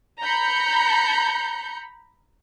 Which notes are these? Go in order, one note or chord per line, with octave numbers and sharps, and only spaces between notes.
A#5 B5 G6 C#7